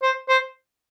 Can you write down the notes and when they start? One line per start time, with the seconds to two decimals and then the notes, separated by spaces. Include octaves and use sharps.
0.02 C5
0.29 C5